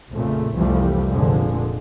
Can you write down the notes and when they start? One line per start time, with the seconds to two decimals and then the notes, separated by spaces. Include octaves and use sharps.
0.12 A#1 F2 A#2 C#3 A3
0.55 C2 F2 E3 F3 G3 A3
1.12 F1 A#2 D3 F3 G#3